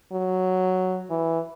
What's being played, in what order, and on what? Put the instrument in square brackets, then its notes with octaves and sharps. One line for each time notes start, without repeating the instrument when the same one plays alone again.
[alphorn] F#3
E3